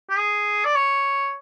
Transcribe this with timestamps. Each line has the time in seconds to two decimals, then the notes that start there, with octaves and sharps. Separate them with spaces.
0.10 G4
0.18 G#4
0.65 D5
0.75 C#5